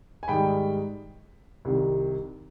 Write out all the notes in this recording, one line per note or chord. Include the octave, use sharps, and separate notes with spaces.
G#5
G#2 D#3 G3 G5 B5
C2 C3 D#3